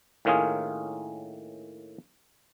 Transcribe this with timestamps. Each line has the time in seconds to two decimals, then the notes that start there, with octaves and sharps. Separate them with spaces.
0.25 A2 D#3 A#3 C#4 F4 G#4